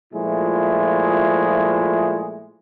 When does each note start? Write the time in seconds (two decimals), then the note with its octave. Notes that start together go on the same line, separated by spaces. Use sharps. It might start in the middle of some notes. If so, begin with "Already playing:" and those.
0.14 A#2 F3 G#3 A3 E4